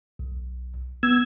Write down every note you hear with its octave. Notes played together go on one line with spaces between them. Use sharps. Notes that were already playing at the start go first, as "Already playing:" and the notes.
B1
B3 E6 G#6